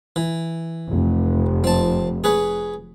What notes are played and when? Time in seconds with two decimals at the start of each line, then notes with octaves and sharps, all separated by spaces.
0.16 E3
0.89 F1
1.64 C4 A5
2.24 G#4 B4 C#5